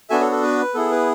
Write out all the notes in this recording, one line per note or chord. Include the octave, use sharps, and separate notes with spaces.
B3 D4 F#4 A4 E5 G#5
A4 C#5
A4
B4
B3 E4 G#4 A4
B4